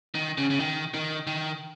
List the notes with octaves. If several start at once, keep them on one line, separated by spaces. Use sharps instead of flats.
D#3
C#3
C#3
D#3
D#3
D#3